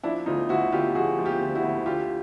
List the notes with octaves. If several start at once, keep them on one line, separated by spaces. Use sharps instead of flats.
F3 D4 E4
D2 D#4 F4
D2 E4 F#4
D3 F4 G4
F3 F#4 G#4
F3
F4 G4
D2
E4 F#4
D2
D3 F4 G4